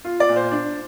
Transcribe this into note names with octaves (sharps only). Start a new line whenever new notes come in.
F4
D5
A#2
C5
D4